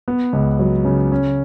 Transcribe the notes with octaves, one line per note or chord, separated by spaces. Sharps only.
B3
C#2
F#3
C#3
C#4